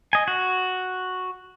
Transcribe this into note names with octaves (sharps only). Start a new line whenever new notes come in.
D#5 G#5
F#4